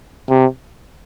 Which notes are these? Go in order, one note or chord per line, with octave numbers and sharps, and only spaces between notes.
C3